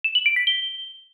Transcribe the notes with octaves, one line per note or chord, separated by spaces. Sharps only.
E7
F#7
D7
B6
G7